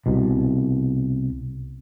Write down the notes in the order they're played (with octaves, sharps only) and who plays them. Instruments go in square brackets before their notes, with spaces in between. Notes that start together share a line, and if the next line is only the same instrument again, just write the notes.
[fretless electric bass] C2 B2